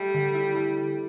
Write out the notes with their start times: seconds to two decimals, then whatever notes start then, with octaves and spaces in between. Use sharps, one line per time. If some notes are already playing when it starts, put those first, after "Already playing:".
Already playing: G3 A3
0.14 D3
0.34 E4
0.55 A3